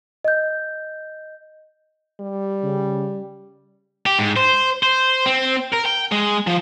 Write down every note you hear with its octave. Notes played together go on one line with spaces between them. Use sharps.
D#5 G6
G3
C#3
G4
G#2
C5
C5
C4
A#4
G5
G#3
F3